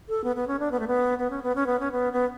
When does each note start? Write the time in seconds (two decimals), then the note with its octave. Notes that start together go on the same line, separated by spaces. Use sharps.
0.09 A4
0.24 B3
0.36 B3
0.48 C#4
0.60 D4
0.71 B3
0.79 A3
0.88 B3
1.18 B3
1.30 C#4
1.43 B3
1.55 C#4
1.66 B3
1.80 C#4
1.92 B3
2.13 B3